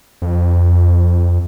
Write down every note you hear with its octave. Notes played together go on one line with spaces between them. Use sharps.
F2